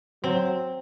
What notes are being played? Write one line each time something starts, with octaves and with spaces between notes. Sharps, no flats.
F#3 C4